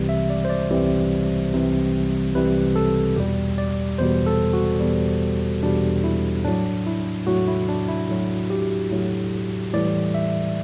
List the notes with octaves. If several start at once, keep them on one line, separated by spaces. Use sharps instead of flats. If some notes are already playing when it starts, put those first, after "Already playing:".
Already playing: C2 C3 E3 G3
E5
D5
C5
D5
C2 C3 E3 G3
C2 C3 E3 G3
C2 C3 E3 G3 B4
A4
E2 B2 G3 G4
D5
E2 B2 G3 C5
A4
F#4
E2 B2 G3
E2 B2 G3 D4
E4
A2 F#3 D4
E4
A2 F#3 F#4
E4
D4
E4
A2 F#3
G4
A2 F#3
A2 E3 G3 D5
E5